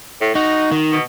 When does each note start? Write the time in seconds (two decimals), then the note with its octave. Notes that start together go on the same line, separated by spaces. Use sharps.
0.21 A2
0.35 D#4 F#4
0.72 D#3
0.92 B2